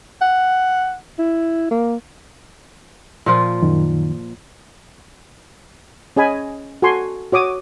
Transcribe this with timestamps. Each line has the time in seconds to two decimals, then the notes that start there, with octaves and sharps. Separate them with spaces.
0.21 F#5
1.19 E4
1.71 A#3
3.26 A#2 F3 F4
3.62 F#2 D#3
6.16 C#4 G#4 D#5 G#5 B5
6.82 F#4 A4 G#5 C6 C#6
7.32 F#4 C#5 D6 D#6